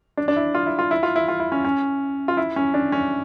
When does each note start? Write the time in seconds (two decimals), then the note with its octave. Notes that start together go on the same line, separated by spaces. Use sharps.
0.17 D4
0.28 D4
0.36 E4
0.55 F4
0.66 E4
0.79 F4
0.91 E4
1.03 F4
1.16 E4
1.28 F4
1.40 E4
1.52 C#4
1.64 C#4
2.28 F4
2.37 E4
2.56 C#4
2.74 D4
2.92 C#4